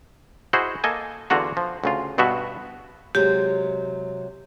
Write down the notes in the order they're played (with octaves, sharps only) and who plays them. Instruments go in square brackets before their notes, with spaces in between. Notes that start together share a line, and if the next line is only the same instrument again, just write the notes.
[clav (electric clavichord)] E4 F#4 G#4 C5 D#5
A#3 A4 D#5 G#5
E2 D3 F4 F#4 A#5
F3
D2 C#3 F4
G2 B2 B3 F#4 E5
[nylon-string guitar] C3 F#3 G#3 [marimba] G4